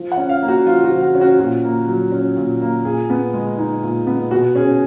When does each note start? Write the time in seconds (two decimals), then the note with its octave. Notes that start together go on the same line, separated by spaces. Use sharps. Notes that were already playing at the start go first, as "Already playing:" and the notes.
Already playing: F3
0.12 F#5
0.17 C#4
0.29 F5
0.42 A#3
0.48 F#4
0.66 F3 F4
0.84 F#4
0.90 F3
1.02 F#4
1.15 C#4
1.21 F#4
1.39 A#2 F#4
1.64 A#3
1.88 F#3
2.12 C#4
2.36 A#2
2.61 A#3
2.85 A#2 G#4
3.10 B3
3.33 G#3
3.58 D#4
3.83 A#2
4.07 B3
4.31 B2 F#4
4.55 C#4 G#4